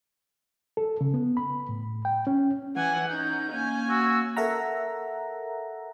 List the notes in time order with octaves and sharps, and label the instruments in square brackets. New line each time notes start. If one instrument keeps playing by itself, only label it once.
[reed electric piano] A4
C#3
B3
B5
A2
G5
C#4
[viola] E3 G#5 [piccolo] F#5
[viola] C#4 D#4 [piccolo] G6
[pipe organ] A#3 [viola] C#4 G#5
[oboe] F#4 [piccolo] E6
[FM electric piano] A4 A#4 E5 F#5 A#5